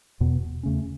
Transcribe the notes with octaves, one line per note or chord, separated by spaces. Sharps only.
E2 B2 B3
E2 C#3 A3 C#4